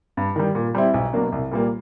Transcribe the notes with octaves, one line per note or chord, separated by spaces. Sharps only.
G2
D#3 G3
A#2
G3 C4 E4
B1
B2 F#3 A#3 D4
C2
A#2 G3 A#3